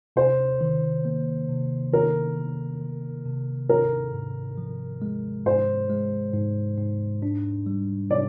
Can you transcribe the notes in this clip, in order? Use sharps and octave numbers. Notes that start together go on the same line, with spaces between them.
C3 C5
D#3
A#3
C3
D#3 A#4
D#3
D#3
C3
G#2 A#4
G#2
F3
G#3
G#2 C5
G#3
G#2
G#2
D4
G3
C3 D5